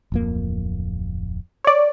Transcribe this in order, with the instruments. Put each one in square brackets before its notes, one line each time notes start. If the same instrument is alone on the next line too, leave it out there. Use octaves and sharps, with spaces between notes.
[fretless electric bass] D1 F2 A#3
[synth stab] C#5 D5